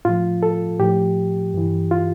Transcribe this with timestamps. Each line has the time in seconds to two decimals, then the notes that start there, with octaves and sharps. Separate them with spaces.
0.05 A2 F3 F4
0.43 A4
0.79 A2 F3 G4
1.54 G2 E3
1.91 F4